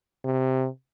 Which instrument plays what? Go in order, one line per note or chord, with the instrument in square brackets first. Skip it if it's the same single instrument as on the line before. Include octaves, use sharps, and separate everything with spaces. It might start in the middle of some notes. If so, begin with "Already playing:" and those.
[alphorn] C3